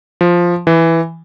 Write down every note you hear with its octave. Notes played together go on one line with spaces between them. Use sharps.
F3
E3